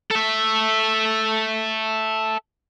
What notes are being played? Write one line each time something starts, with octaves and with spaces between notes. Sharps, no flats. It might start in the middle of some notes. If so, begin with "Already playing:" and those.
A4 E5